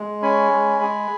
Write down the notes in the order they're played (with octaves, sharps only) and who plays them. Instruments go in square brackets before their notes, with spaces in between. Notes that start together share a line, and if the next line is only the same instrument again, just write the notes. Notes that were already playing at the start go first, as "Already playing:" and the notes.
Already playing: [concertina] G#3
C#4 G#5 B5
G#3
G#4